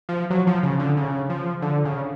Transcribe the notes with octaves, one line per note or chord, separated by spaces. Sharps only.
F3
F#3
F3
C#3
D3
C#3
F3
D3
C#3